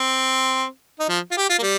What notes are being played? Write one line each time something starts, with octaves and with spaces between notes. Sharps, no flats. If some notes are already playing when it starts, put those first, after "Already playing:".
Already playing: C4
D#4
F3
F4
G4
F4
A#3
G3